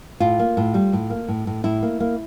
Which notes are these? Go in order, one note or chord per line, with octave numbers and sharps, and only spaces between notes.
A2 F4
A#3
A2
G3
A2
A#3
A2
A2
A2 E4
A#3
A#3